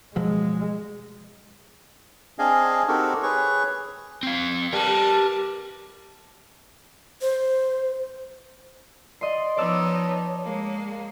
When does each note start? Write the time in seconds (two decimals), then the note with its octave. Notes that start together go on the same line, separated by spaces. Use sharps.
0.16 B2 F3 F#3 G#3
2.39 C4 D4 G#4 D#5 F5 G#5
2.88 C4 D#4 F#4 G4 A4 A#4
3.23 G#4 B4 C#5 C#6
4.23 C4 F5
4.73 G3 A#4 B4 A5
7.21 C5
9.21 D5 D#5 C6
9.57 F3 B3 D#4 C#5 D5 A5 E6
10.43 G#3 A#3